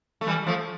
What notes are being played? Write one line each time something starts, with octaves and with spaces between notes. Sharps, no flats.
A3
E3 G3
F3 A3